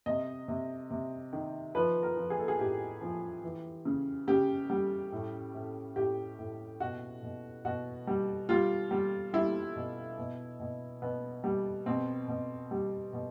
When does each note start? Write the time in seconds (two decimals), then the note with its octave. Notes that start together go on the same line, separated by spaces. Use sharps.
0.06 C3 D#5
0.48 C3
0.90 C3
1.33 D#3
1.75 F3 B4
2.03 A#4
2.17 F3
2.30 G#4
2.39 A4
2.48 G#4
2.59 A2 G4
3.01 F3
3.44 E3
3.85 C#3
4.28 C#3 G4
4.70 G3
5.12 A2
5.54 A2
5.96 A2 G4
6.39 A2
6.80 B2 F#4
7.23 B2
7.65 B2 F#4
8.07 G3
8.49 G3 F4
8.91 G3
9.33 G3 E4
9.76 B2
10.18 B2
10.60 B2
11.02 B2 B3
11.44 G3
11.86 B2 C4
12.28 B2
12.71 G3
13.13 B2